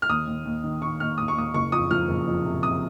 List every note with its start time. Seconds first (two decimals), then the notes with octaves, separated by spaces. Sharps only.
0.02 F6
0.09 D#2 D#6
0.27 D#2
0.45 D#2
0.64 D#3
0.82 D#3 C#6
1.00 D#2 F6
1.18 D#2 D#6
1.28 C#6
1.36 D#2 D#6
1.54 F#1 C#6
1.72 F2 D#6
1.91 F3 F6
2.09 F#1
2.27 F2
2.45 C3
2.63 C3 D#6